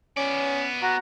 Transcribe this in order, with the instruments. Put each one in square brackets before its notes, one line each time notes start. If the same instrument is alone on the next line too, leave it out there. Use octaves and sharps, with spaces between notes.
[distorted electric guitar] B3 D5 [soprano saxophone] C#4
[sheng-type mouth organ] F#4 F#5 A#5